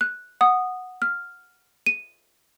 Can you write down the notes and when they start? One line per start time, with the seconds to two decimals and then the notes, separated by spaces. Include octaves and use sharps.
0.01 F#6
0.41 F#5 D#6
1.02 F6
1.86 D#7